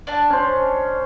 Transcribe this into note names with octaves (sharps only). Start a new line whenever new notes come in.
D4 A5
C#4 C5